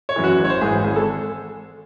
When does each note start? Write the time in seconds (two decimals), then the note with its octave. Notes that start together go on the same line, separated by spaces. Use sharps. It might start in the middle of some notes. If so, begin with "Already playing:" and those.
0.09 C#5
0.16 F#2 E3
0.24 F#4
0.39 A1
0.45 C#5
0.50 C5
0.61 G#2 E3 G#4
0.84 G#1 G#4
0.96 A4